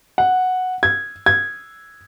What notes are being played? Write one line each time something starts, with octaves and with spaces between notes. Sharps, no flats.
F#5
G#6
G#6